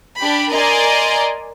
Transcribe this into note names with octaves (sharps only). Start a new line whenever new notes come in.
D4 G4 B5
A#4 D5 D#5 G#5 A#5 C6